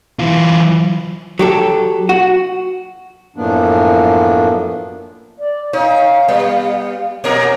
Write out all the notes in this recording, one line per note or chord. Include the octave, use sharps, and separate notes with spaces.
E3 F4
F#3 G4 A4
F#4
F#2 A2 F3 A#3 B3 D4
D5
C#4 D#4 F5
G3 B3
A#2 F#3 C#4 D#4 A#4